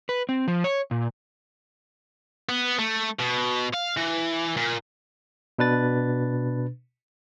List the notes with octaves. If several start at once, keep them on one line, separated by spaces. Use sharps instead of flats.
B4
C4
F3
C#5
A#2
B3
A3
B2
F5
E3
A#2
B2 D4 B4 A6